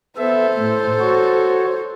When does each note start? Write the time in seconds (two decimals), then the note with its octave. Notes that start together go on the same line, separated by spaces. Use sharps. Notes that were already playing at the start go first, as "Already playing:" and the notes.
0.17 B3 A4 C5 E5
0.58 A2
1.00 F#4 C#5